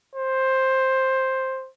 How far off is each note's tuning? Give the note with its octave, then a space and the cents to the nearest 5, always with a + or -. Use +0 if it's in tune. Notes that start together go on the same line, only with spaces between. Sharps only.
C5 +10